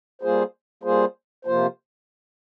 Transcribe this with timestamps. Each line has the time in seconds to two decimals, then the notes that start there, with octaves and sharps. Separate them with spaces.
0.22 G3 A#3 F4 G#4 C5
0.83 G3 A#3 F4 G#4 C5
1.45 C3 F3 A#3 F4 C5